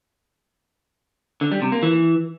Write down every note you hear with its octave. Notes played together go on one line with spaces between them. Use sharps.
D3
G3
C3
A#3
E3